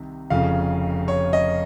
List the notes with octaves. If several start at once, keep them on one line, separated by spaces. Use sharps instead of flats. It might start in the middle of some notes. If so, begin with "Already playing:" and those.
Already playing: C2 C3 D#3
F1 F2 C#3 F5
C#5
D#5